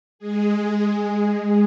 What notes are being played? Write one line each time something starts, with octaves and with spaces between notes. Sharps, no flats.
G#3 G#4